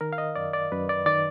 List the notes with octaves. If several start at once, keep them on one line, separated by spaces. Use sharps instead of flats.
D#3 A#4
F5
D#5
F#2 D5
D5
F#2 B4
D5
D#3 D5